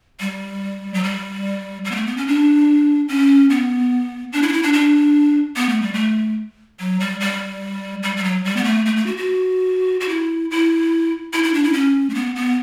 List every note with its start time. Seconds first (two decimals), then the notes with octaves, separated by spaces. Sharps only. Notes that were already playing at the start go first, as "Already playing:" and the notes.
0.20 G3
0.94 F#3
1.04 G3
1.85 G3
1.91 B3
1.95 A3
2.07 B3
2.17 C#4
2.27 D4
3.08 C#4
3.50 B3
4.33 D4
4.42 E4
4.48 D4
4.53 E4
4.63 D4
4.74 D4
5.56 B3
5.69 A3
5.82 G3
5.94 A3
6.79 F#3
7.00 G3
7.20 G3
8.03 G3
8.17 G3
8.24 F#3
8.45 G3
8.56 B3
8.64 A3
8.86 A3
8.96 A3
9.06 F#4
9.17 F#4
10.00 F#4
10.09 E4
10.51 E4
11.33 E4
11.44 E4
11.54 D4
11.64 E4
11.73 C#4
12.10 A3
12.14 B3
12.36 B3